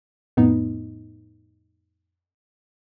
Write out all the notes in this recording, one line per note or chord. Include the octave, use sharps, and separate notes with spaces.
F2 A2 B3 D#4